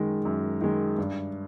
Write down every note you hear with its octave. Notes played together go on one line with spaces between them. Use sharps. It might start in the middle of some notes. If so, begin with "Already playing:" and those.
Already playing: F#2 D#3 G#3
F#2
D#3 G#3
G2